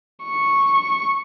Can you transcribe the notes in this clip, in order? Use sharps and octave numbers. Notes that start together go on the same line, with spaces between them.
C#6